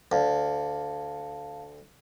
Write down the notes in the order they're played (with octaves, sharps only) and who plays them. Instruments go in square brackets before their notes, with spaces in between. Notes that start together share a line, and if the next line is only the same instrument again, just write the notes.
[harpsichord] D2 [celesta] F5 A5